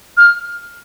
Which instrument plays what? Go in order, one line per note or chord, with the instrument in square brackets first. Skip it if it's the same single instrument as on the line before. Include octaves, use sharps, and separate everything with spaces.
[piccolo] F6